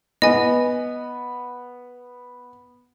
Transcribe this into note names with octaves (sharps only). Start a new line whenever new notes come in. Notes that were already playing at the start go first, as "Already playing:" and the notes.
B3 D#5 G#5